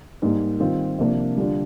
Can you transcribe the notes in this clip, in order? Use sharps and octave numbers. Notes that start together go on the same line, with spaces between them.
G#2 G3 A#3
D#3 G3 C4 F4
C3 F3 A#3 D4
D3 G3 D4 F4